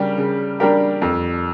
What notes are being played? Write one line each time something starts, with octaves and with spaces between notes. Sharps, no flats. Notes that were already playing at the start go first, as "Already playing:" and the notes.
Already playing: C#3 G3 D4 G4 A#4
C#3
G3 D4 G4 A#4
F2